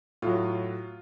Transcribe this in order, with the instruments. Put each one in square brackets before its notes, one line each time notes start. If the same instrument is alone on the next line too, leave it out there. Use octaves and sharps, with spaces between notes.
[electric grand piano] A2 F#3 [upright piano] F4